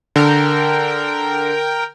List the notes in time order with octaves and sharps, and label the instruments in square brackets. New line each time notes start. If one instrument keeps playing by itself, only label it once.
[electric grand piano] D3 [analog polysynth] A#4 G5